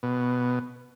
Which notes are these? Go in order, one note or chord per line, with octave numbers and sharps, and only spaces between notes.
B2